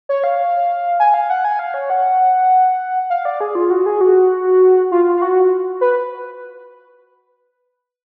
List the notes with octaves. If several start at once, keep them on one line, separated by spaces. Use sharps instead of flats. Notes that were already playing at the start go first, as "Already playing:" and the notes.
C#5
F5
G#5
F5
F#5
G#5
F5
C#5
F#5
F5
D5
G#4
F4
F#4
G#4
F#4
F4
F4
F#4
B4